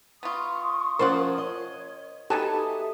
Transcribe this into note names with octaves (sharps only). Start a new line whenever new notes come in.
B3 F4 C6 C#6 D#6
F3 C#4 F4 A#4 C5 D5 F#5
C#5 D#5
F#3 B3 D#4 G4 A4 G#5 A5
E5 D#6